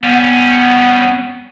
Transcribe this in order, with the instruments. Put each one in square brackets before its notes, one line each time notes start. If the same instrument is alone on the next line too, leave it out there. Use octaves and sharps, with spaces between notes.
[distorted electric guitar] G3 C#4 [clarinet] B3